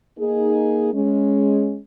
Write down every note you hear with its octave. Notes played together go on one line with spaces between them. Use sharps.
A#3 D#4 G#4
G#3 C#4